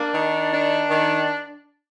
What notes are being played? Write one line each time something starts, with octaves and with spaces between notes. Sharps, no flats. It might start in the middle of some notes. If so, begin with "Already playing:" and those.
Already playing: A#3 D4
D#3
D4
D#3